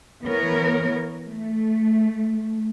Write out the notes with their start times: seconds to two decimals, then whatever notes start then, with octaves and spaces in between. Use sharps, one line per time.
0.23 E3 B3 A#4 C#5
1.26 A3